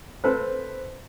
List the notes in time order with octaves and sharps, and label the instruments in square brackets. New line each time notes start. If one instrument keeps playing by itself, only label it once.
[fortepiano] C4 A4 B4 [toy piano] C5